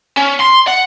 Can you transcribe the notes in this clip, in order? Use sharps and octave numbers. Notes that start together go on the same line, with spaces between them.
C#4
C6
F#5